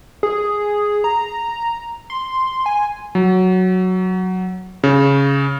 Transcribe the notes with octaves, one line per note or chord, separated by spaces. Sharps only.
G#4
A#5
C6
G#5
F#3
C#3